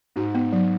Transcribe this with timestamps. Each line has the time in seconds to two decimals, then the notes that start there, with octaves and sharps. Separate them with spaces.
0.16 G#2 F#4
0.35 B3
0.53 F#3